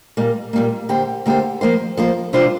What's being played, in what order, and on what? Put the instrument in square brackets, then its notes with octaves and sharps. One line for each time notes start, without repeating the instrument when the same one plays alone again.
[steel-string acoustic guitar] A#2 G3 A#3
A#2 G3 A#3
D3 A#3 G4 C5
D3 A#3 G4 C5
F3 A#3 F4 C5
F3 A#3 F4 C5
C3 G3 D4 F4 C5